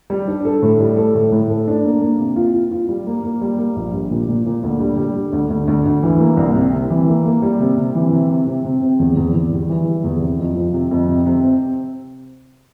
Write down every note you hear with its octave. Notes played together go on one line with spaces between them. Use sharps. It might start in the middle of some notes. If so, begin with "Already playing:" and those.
G3
D4
A4
A2
G3
A4
A2
A2
A4
D4
A#3
A#3
C3
F4
F4
F4
G3
A#3
A#3
G3
A#3
A#1
G3
A#2
A#2
A#2
D2
G3
G3
D3
D2
D2
D2
D2
E3
A#3
C2
C3
C3
E3
A#3
A#3
G3
C3
C3
E3
C3
C3
C3
C3
C4
E2
E2
E2
G3
E3
G3
E2
C3
F2
F3
C3
F2
C3
C3
C4